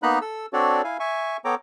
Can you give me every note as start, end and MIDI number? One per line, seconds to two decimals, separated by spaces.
0.03 0.19 58
0.03 0.19 59
0.03 0.19 63
0.03 0.19 82
0.03 0.19 83
0.03 0.19 90
0.21 0.46 69
0.21 0.46 88
0.53 0.82 60
0.53 0.82 62
0.53 0.82 66
0.53 0.82 69
0.53 0.82 73
0.53 0.82 74
0.84 0.97 64
0.84 0.97 77
0.84 0.97 80
1.00 1.37 76
1.00 1.37 80
1.00 1.37 85
1.45 1.55 59
1.45 1.55 69
1.45 1.55 73
1.45 1.55 79
1.45 1.55 82
1.45 1.55 86